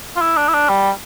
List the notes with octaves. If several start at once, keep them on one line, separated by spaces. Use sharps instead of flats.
F4
E4
D4
E4
D4
G3